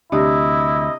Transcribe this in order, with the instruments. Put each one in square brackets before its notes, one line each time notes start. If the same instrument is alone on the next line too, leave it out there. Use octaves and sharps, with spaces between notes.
[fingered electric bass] D2 [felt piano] C3 G3 D4 [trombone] E4 [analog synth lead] D#5